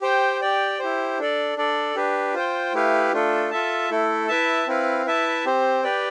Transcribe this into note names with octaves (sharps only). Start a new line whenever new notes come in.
G4 C5 G5
G4 D5 G5
E4 G4 C5
D4 A4 D5
D4 A4 D5
D4 G4 B4
F4 C5 G5
A3 E4 G4 B4 F5
A3 D4 F4 A4
F4 A4 E5 A5
A3 E4 A4
E4 B4 E5 A5
C4 E4 B4 F5
E4 B4 E5 A5
C4 G4 C5
G4 B4 D5 G5